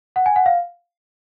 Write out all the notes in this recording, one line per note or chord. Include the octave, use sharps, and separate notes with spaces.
F#5
G#5
F#5
F5